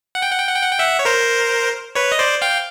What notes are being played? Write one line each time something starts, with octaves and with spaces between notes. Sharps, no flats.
F#5
G5
F#5
G5
F#5
G5
F#5
G5
E5 F#5
C#5
A#4 C5
B4 C#5
D#5
C5 D5
F5 G5